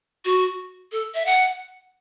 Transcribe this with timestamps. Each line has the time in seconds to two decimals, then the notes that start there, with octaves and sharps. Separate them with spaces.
0.25 F#4
0.92 A4
1.14 E5
1.26 F#5